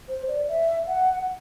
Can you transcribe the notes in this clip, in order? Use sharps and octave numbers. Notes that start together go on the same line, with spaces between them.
C5
D5
E5
F#5